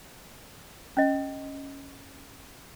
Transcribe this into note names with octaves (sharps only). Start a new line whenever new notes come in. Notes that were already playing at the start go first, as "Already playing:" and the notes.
C#4 D#5